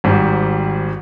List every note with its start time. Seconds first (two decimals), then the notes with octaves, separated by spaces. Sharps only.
0.04 G#1 G#2 G3